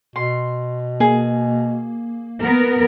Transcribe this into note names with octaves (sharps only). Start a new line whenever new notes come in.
B2 C6
A#3 G#4
B3 A#4